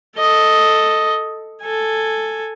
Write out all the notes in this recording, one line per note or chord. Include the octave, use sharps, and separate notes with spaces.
A4 D#5
A4 G#5